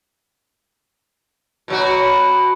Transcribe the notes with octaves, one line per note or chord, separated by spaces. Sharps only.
B2 F#3 F#4